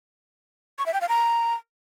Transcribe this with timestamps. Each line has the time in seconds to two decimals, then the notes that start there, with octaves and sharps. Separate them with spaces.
0.79 C#6
0.86 E5
0.94 G5
1.01 F5
1.09 A#5